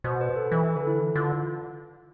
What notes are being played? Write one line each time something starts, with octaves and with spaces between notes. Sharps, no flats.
B2 C5
B4
A4
E3
B4
D3 A4
E4
E3
D3 F4